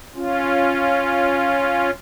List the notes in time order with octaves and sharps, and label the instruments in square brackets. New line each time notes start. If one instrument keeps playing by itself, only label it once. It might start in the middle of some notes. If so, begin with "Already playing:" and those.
[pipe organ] C#4 F4